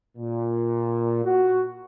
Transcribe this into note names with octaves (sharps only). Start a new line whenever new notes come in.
A#2
F#4